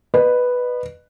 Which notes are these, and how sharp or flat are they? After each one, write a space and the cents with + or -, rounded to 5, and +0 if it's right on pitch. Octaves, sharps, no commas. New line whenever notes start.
B4 +0 D#5 -35